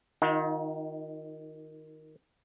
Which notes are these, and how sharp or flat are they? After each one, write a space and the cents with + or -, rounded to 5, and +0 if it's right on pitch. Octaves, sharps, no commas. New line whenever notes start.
D#3 +0 D#4 +35 F#4 -45